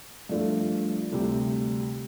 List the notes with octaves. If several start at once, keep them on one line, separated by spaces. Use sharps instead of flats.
G2 F3 A3 D4 F4
D2 C3 G3